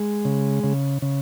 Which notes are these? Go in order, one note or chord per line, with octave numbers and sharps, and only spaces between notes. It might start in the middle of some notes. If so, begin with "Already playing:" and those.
Already playing: G#3
C#3
C#3
C#3